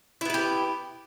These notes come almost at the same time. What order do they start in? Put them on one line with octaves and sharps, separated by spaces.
E4 B3 B4 G4